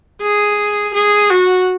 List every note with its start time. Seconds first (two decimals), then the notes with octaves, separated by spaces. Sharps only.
0.22 G#4
0.94 G#4
1.30 F#4